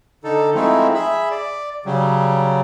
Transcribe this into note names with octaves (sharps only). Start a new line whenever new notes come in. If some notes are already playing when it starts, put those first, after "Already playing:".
D3 D#4 A4
F3 G#3 A3 C4 D#4 E4
G#4 E5 B5
D5
C#3 F#3 G3